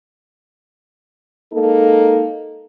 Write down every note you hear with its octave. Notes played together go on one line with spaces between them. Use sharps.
G#3 A#3 D#4 A4